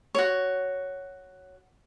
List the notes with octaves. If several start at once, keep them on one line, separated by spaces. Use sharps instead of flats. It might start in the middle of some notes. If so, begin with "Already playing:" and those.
F#4 C#5